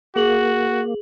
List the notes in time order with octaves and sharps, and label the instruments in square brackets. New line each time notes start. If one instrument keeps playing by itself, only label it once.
[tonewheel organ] A#3 [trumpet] F#4 [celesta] G#4 F#7